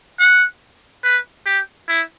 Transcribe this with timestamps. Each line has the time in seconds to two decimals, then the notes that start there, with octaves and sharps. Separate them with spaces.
0.19 F#5
1.04 B4
1.46 G4
1.88 E4